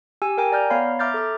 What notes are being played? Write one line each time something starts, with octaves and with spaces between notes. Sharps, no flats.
G4 G#5 E6
A#4 G5 G#5 A#5
D5 A#5 F6 G6
B3 C#5 F5 B5
E5 A#5 D6 F6 G6 A6
A4 D6